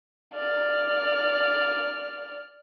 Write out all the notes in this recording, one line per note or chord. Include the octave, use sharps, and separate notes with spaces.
D5 F6